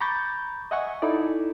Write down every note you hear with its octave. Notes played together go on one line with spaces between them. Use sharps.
A#5 B5 C#6 D6 G6 A6
D#5 E5 F#5 G#5 C#6
D#4 E4 A4 D5